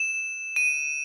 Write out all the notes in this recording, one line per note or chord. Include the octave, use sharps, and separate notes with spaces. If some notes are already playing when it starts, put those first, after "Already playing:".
Already playing: E7
D#7